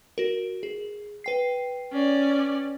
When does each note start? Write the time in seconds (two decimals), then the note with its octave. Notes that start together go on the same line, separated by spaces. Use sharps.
0.18 F#4 A#4
0.63 G#4
1.24 B4 G5 C7
1.92 C#4 D5